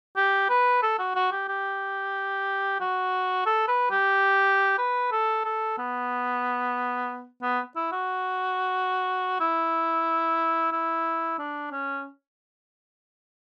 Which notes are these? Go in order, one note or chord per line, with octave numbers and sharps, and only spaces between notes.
G4
B4
A4
F#4
F#4
G4
G4
F#4
A4
B4
G4
B4
A4
A4
B3
B3
E4
F#4
E4
E4
D4
C#4